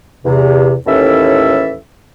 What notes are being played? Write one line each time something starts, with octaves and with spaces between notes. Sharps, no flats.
E2 C3
D#2 A2 E3 C#4 A4 E5